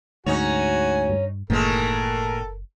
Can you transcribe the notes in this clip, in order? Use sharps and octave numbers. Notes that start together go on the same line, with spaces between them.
D2 G#2 C#4 D#4 F#4 C#5 G#5
G2
F#1 A2 D#3 E3 G#3 A#3 A4 A#4